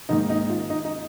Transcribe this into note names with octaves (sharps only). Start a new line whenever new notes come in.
G#2 D#3 A#3 D#4
D#4
F4
D#4
D#4